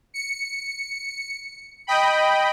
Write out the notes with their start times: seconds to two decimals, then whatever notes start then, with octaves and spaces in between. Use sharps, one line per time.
0.14 C#7
1.87 D#5 G5 B5